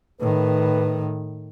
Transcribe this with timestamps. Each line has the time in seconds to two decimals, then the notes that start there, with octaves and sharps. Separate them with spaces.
0.21 A2 D#3 B4